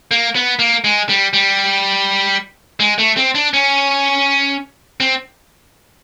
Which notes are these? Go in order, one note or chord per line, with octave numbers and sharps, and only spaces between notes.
A#3
B3
A#3
G#3
G3
G3
G#3
A3
C4
D4
C#4
C4